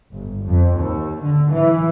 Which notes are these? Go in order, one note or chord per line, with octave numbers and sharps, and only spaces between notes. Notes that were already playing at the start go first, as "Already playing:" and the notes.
G1
F2
D#2
D3
E3